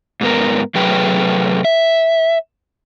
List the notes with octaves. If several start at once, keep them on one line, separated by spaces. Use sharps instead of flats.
G#2 B3 A#4
C3 F#3 A3 G#4 B4 G5
E5